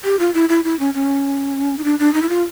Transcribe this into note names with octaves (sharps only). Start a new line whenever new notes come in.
G4
F4
E4
E4
E4
C#4
C#4
D#4
D4
D4
D#4
E4
F4